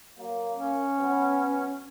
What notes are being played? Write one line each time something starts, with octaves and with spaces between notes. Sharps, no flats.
F#3 A#3
C#4
F#3 B3